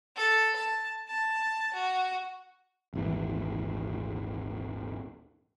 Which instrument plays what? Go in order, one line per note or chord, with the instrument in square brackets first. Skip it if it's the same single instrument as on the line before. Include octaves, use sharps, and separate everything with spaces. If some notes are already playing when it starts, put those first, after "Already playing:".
[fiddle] A4
A5
A5
F#4
[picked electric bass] D#1 G#1 E3